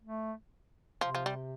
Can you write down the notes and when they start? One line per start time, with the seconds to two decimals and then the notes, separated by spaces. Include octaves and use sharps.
0.03 A3
1.01 C3 F3
1.15 F3
1.26 G3